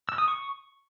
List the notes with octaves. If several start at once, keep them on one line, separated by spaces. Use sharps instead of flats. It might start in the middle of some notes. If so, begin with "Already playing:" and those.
E6
D#6
C#6